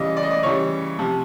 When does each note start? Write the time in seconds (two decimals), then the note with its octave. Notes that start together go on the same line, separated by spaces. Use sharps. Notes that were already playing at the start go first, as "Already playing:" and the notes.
Already playing: C#3 E3 G3 D#5
0.17 D5
0.23 D#5
0.31 D5
0.43 C#3 E3 G3 C#5
0.99 C3 F3